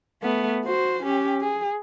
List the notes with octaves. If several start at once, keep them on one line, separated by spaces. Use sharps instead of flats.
A3 B3
F#4 C5
C#4 G4
G#4